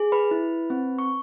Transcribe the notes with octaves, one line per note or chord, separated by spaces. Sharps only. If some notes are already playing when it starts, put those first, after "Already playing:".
Already playing: G#4
B4 B5
E4
C4
C#6